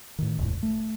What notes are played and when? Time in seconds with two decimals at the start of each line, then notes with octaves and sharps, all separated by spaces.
0.19 A2 D#3
0.39 E1 C#2 A2
0.63 A3